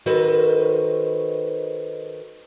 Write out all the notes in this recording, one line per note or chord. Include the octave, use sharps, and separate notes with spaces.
D#3 F#4 A4 B4 C5 D#5